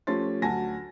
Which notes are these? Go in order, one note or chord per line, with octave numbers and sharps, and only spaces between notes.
F3 A3 C#4 G4 C6 A6
D2 F#3 F#4 G#5 A5 A#6